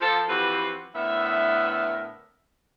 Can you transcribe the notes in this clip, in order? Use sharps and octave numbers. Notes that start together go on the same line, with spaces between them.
F3 A4
E3 F3 C4 F#4 G4 B4
A2 D3 B3 A#4 E5